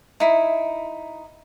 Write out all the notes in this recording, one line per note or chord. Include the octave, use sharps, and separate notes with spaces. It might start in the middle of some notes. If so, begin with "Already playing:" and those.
D#4 E4